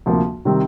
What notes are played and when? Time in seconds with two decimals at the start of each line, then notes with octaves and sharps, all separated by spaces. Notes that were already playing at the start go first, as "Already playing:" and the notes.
0.06 D2 C3 F3 A#3
0.45 C3 D#3 G3 C4